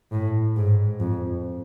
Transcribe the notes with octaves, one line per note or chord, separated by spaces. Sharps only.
A2
G#2
F2